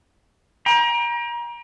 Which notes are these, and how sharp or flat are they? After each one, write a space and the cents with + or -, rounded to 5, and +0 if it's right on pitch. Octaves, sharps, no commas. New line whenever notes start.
G5 +25 A#5 +30